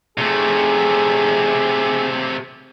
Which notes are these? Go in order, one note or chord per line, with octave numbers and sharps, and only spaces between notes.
C3 A3 G#4